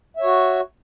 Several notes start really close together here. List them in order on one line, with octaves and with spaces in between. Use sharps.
E5 C#5 F#4